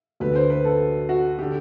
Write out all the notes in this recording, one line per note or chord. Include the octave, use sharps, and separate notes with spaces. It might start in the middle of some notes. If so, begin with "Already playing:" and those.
D2 D3 B4
C5
B4
A4
F#4
D3 G4